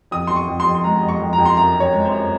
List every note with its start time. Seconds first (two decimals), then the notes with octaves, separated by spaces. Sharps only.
0.11 F2 D#6
0.27 F2 C6
0.36 C#6
0.48 F2
0.60 C6
0.66 F2
0.75 C6
0.84 G#3 A#5
1.03 F2
1.09 C#6
1.20 F2
1.33 A#5
1.38 F2
1.45 C6
1.56 F#2 A#5
1.74 F#2
1.80 C#5
1.92 G#3
2.05 C5
2.10 F#2